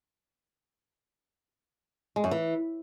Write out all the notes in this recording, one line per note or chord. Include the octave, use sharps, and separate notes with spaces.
G#3
F#2
E3